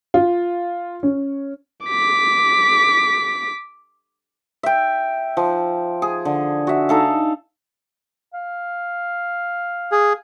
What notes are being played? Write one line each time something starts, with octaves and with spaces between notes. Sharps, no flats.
F4
C#4
D6 B6
E5 G5
F3
G#4
D3
F#4 E5
D#4 A4 F5
F5
G#4